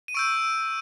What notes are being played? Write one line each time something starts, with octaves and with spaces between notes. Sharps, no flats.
D#7
C#6 E6 G6 D7